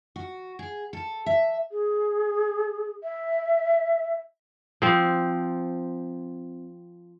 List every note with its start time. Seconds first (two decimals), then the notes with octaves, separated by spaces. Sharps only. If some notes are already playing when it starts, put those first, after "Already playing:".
0.16 F#4
0.59 G#4
0.93 A4
1.26 E5
1.72 G#4
3.03 E5
4.82 F3 C4